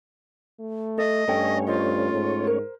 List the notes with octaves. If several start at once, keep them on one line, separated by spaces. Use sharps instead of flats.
A3
A4 D#5 E5
G2 A3 C#4 A4 C#5 G5 G#5
F4 C5 D#5
G#2
A#4 C5